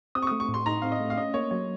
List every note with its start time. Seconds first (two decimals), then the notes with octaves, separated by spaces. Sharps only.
0.15 C4 D#6
0.22 C#6
0.27 D#6
0.32 A3
0.40 C#6
0.49 A2
0.54 C6
0.66 D#4 A#5
0.82 C4 F5
0.92 D#5
1.00 A3
1.10 F5
1.17 C#4 D#5
1.34 A#3 C#5
1.51 F#3 C#5